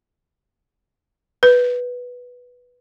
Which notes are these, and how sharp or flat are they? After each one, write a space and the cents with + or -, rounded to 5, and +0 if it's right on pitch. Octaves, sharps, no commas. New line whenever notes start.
B4 -5